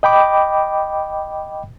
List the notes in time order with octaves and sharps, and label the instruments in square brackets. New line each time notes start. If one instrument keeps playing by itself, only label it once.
[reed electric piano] D#5 G5 B5 D6